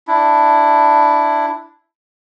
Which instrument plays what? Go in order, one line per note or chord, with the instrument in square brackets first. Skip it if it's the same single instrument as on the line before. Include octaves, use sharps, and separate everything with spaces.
[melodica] D4 E4